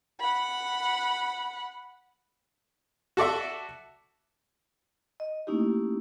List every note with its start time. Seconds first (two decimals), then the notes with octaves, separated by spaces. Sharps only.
0.20 F#5 B5
3.17 F#4 A4 D5 E5
5.20 D#5
5.47 A3 A#3 C#4 D#4 E4 G4